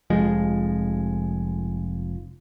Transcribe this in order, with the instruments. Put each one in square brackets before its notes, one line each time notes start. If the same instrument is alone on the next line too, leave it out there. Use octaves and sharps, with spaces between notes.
[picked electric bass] F1 F3 G#3